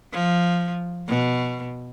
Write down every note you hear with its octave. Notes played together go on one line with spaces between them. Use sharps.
F3
B2